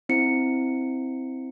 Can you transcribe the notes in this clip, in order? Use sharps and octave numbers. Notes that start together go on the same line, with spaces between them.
C4 E4 C#7